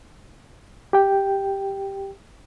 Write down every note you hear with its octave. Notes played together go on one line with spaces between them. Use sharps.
G4 G5